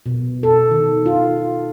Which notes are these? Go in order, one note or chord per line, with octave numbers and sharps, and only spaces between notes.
B2
A4
D#3
F4